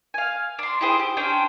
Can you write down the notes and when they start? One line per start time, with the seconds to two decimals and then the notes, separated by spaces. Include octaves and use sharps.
0.14 F5 G#5
0.59 D4 C6
0.81 E4 G4 G#4 C5
1.00 G4
1.17 C#4 D4 C5 G5